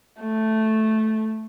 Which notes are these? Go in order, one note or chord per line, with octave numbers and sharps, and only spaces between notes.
A3